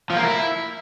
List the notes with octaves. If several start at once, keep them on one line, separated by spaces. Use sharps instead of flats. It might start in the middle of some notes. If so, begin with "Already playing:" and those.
F3
A#3
E4